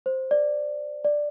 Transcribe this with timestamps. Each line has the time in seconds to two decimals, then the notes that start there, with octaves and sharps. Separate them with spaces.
0.06 C5
0.31 D5
1.04 D5